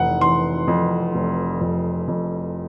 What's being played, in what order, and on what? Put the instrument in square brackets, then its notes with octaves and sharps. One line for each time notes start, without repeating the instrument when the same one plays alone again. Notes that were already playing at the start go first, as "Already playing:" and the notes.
Already playing: [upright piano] F1 E3 F#5
E3 C6
F2
F1
F2
F2